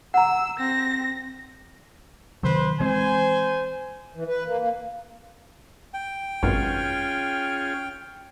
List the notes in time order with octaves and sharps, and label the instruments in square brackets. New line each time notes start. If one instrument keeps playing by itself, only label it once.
[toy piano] F#5 A#5 [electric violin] E6
[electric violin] C4 A#6
[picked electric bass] C3 D#3 F#3 [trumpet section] B4 C5
[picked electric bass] E3 G#3 C4 [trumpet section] C5 G#5
[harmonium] E3
B4
A#3
A#3
[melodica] G5
[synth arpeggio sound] G#1 F#2 B2 [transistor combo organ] C#4 F4 G#4